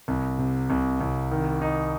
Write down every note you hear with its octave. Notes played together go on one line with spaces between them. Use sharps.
C2
C3
C2
C2
D#3
D#4